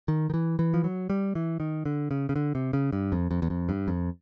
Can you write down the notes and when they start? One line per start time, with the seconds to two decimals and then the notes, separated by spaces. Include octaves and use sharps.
0.08 D#3
0.30 D#3
0.34 E3
0.59 E3
0.74 F3
0.84 F#3
1.10 G3
1.35 E3
1.60 D#3
1.86 D3
2.11 C#3
2.29 C#3
2.36 D3
2.55 C3
2.73 C#3
2.93 G2
3.12 F2
3.31 F2
3.42 E2
3.50 F2
3.69 G2
3.88 F2